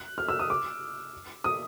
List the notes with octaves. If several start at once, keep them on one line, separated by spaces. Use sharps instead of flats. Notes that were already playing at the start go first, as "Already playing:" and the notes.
Already playing: F#6
F6
E6
D#6
D6
D#6